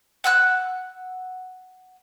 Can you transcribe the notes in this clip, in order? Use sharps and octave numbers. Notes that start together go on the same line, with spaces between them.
F#5 E6 F#6